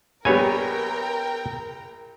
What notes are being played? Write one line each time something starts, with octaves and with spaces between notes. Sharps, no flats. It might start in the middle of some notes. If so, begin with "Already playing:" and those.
A#1 G3 B3 A#4 C#5 G5 G#5 A#5